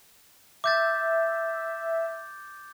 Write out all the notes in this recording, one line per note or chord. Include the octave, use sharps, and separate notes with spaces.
E5 D6 G6 A6